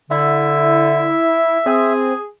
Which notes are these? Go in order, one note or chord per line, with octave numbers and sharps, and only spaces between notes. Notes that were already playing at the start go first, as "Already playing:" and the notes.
D3 E4 E5
C4 G#4